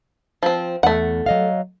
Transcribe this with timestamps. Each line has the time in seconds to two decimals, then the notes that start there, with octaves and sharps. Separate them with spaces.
0.43 F3 C4
0.83 E2 A3 F#5
1.26 F#3 D#5 F5